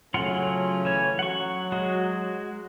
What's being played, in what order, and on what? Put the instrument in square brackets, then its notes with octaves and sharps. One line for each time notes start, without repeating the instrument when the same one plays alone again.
[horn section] C#3 A3 C#4 [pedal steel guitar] F#3 F4 F#5
[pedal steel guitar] E3 C#5
[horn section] F#3 [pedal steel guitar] F#5 C#6
[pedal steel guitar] G#3 F#4